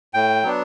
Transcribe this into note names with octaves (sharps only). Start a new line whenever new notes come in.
A2 G5
F#3 B3 D4